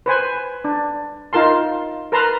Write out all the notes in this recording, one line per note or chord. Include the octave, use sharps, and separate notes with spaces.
B4 C5 G#5
D4
D#4 F4 A#4 A5 C6
A#4 B4 A5 A#5 C6